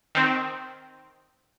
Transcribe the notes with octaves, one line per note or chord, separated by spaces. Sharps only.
D#3 C4